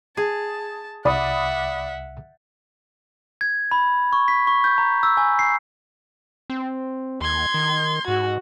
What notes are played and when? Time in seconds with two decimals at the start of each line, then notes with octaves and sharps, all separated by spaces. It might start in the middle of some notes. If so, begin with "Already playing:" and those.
0.17 G#4 A5
1.05 C2 D5 E5 F#5 B5 D#6
3.41 G#6
3.71 B5
4.13 C#6
4.28 B6
4.47 C#6
4.64 G6
4.78 A#5
5.03 E6
5.17 G#5
5.39 C7
6.50 C4
7.21 D#2 C6 G#6
7.54 D#3
8.08 G#2 F#4